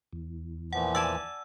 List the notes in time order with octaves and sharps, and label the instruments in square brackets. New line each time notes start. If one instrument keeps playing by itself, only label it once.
[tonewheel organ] E2
[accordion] A#2 E3 F3 [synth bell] F#5
[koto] D5 G#5 A5 [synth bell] E6